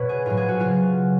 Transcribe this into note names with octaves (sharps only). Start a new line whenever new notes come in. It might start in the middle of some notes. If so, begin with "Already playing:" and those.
Already playing: B2 B4 C#5
G#4
A2 F#3 F4
G#4
F#4
C#3 F#3 F4